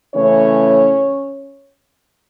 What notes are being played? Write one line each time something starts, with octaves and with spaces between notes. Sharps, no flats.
C#3 E3 A3 C#4 C#5